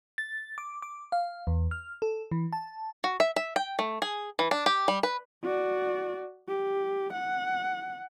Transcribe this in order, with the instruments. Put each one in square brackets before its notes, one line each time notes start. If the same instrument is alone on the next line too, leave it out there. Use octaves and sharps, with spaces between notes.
[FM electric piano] A6
D6
D6
F5
E2
F6
A4
E3
A5
[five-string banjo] F#4
E5
E5
G5
A3
G#4
E3
D4
G4
G3
B4
[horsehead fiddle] F#4 D5
G4
F#5